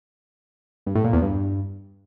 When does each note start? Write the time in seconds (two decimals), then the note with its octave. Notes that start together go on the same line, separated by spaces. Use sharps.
0.86 G2
0.95 A2
1.04 A#2
1.13 E2
1.22 G2